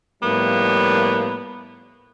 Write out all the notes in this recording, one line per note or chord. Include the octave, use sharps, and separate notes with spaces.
A2 F3 G3 A#3 B3 E4